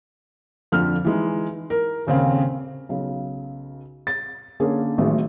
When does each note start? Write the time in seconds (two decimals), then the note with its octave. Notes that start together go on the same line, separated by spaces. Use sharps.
0.72 F2 D3 F3 F6
1.05 E3 G#3 D#4
1.70 A#4
2.06 D#1 C#3 C4 F5
2.89 B1 C#3
4.07 A6
4.60 D3 A#3 C#4 G#4 A#4
4.98 A1 A2 D#3 F#3 G#3